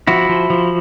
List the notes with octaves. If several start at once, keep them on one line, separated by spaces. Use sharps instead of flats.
F3 E4 F#4
F3
F3